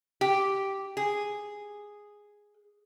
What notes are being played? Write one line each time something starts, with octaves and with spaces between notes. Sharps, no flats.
G4
G#4